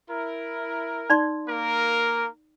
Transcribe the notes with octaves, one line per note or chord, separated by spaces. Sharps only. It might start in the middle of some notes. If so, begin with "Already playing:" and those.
E4 A#4
D#4 D5 C6
A#3 A#4